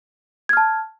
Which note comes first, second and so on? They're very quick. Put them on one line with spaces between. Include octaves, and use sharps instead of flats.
G#6 F6 A5